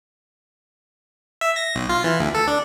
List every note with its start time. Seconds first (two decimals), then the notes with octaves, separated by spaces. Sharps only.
1.41 E5
1.56 A#6
1.75 B1
1.89 F4
2.04 E3
2.20 D2
2.35 A4
2.48 D4